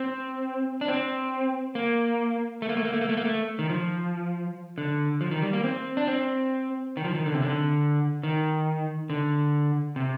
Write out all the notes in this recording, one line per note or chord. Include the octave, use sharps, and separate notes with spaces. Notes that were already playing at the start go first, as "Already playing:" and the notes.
Already playing: C4
D4
C4
A#3
A3
A#3
A3
A#3
A3
A#3
A3
A#3
A3
D#3
F3
D3
F3
D#3
G3
A#3
C4
D4
C4
D#3
F3
D#3
D3
C3
D3
D#3
D3
C3